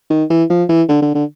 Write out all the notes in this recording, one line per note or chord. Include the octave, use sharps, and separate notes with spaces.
D#3
E3
F3
E3
D3
D3
D3